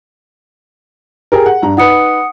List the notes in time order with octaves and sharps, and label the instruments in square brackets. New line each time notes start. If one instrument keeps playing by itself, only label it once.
[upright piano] G4 G#4 A#4
F#5
G2 A#5
[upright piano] D#4 B4 [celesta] F#5 D#6 C#7